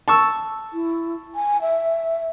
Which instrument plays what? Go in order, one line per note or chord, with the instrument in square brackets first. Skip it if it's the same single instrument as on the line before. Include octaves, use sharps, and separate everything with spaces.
[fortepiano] A5 C#6 E6
[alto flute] E4
G#5
E5